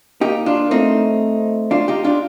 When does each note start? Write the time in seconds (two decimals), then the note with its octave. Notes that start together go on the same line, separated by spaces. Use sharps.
0.21 A#3 D#4 G4
0.46 D4 F4
0.71 A3 C4 D#4
1.71 D4 F4
1.88 D#4 G4
2.04 D4 F4